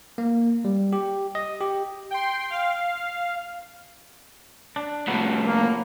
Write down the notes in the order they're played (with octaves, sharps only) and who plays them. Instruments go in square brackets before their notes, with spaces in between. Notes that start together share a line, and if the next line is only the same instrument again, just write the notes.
[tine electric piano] A#3
G3
G4
D#5
G4
[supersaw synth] G5 C6
F5
[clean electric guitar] D4
[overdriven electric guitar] A2 C3 [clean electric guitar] F3 F#3 B3
[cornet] A#3